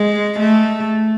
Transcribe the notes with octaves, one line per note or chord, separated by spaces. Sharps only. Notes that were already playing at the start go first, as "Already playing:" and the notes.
Already playing: G#3
A3